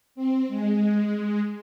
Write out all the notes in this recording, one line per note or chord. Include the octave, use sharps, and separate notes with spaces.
C4
G#3